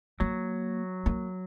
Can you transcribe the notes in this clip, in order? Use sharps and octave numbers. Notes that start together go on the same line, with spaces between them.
F#3 A#3
A#3